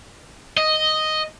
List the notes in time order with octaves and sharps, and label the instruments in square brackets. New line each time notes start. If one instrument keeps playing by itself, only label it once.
[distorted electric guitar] D#5